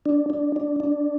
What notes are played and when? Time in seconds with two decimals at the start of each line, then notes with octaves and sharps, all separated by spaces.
0.05 D4
0.30 D4
0.56 D4
0.80 D4